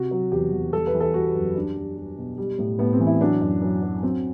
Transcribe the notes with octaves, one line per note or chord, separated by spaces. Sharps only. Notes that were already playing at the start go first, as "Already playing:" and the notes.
Already playing: C3 F#4
F#3
E2 G4
E2
G3 A4
B4
E3
A4
G3 F#4
F#2
G3 D4
G3
G3
B2
G3
A2
A2 B3
C4
E3
E4
F#3 D4
F#2
F#3
F#3
F#3 C4